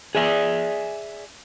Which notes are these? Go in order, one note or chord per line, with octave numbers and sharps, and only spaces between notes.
G#4 D5 E5 G#5